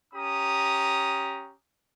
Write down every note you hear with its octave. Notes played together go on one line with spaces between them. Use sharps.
C#4 G4 A#5 D#6